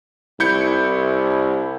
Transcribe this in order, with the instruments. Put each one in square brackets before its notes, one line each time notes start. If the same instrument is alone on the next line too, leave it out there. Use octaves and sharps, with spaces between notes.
[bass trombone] C2 [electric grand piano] E4 G6 C#7